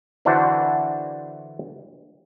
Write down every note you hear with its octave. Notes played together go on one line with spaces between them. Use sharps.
D3 E3 D4 E4 F#4 C5